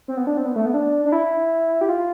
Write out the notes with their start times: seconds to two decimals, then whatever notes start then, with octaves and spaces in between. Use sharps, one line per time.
0.08 C4
0.17 B3
0.27 D4
0.37 C4
0.45 B3
0.56 A3
0.66 B3
0.74 D4
1.05 D4
1.12 E4
1.81 G4
1.89 F4